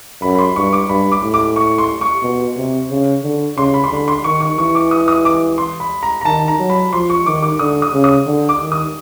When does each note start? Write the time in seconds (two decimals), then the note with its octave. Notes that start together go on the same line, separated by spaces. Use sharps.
0.22 F#2 B5
0.35 B5
0.39 C6
0.56 G2 C#6
0.73 D6
0.89 G2 B5
1.11 D6
1.22 A2
1.34 D6
1.56 C#6
1.78 C6
2.01 C#6
2.23 B2
2.57 C3
2.90 C#3
3.24 D3
3.57 C#3 C6
3.74 B5
3.84 C6
3.91 D3 B5
4.08 C6
4.24 D#3 C#6
4.41 C#6
4.58 E3 C#6
4.75 D6
4.91 D#6
5.08 D#6
5.25 D6
5.58 C6
5.80 B5
6.03 A#5
6.21 A#5
6.25 D#3 A5
6.48 A#5
6.59 F#3
6.70 B5
6.92 F3 C6
7.10 C#6
7.26 D#3 D6
7.43 D6
7.59 D3 D#6
7.82 D#6
7.94 C#3
8.04 D#6
8.27 D3
8.49 D6
8.60 D#3
8.72 D#6